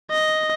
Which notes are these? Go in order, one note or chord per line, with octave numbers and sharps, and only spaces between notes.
D#5